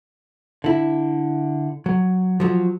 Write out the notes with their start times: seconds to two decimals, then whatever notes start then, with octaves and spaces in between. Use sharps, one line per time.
0.64 D3 E4
1.86 F#3
2.40 F3 F#3